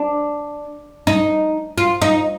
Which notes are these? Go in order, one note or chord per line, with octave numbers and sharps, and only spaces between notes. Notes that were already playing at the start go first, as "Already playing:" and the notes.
Already playing: D4
D#4
F4
D#4